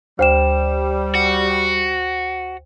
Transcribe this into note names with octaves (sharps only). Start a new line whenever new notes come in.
D2 G3 C5 G5 E7
F#4